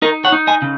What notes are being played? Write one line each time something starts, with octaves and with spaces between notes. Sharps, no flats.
D#4 A#4 D#5
C#5 F#5
D#4
D#5 G#5
C#3